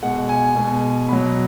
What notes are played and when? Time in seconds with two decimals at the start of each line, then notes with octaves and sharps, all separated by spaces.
0.02 B2 G#3 F#5
0.29 G#5
0.55 B2 G#3
1.09 B2 F#3 B5